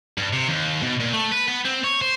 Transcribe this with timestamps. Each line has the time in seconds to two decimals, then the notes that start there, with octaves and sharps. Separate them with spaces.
0.18 G2
0.33 C3
0.48 D#2
0.82 B2
1.00 A#2
1.13 A3
1.32 B4
1.48 B3
1.65 C4
1.84 C#5
2.01 C5